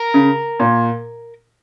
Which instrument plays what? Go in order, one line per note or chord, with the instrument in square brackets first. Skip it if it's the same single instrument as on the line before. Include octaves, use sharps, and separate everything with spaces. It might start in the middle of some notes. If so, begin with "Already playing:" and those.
Already playing: [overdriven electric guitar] A#4
[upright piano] C#3
A#2